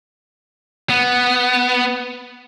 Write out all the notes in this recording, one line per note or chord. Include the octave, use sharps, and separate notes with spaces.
B3